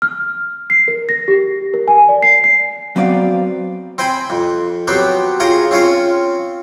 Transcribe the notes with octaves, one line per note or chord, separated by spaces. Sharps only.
F6
C7
A#4
A#6
G4
A#4
G#5
D5
C7
C7
F#3 B3 C4 D5 F5
C4 C5 G5 G#5 B5
F2
F#3 B3 C4 G4 C5
F4 G#4 C#5 G5 A#5 C6
C4 C#4 F4 C#5 F5